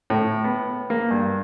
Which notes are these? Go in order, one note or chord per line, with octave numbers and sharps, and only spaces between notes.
A2
B3
A#3
G2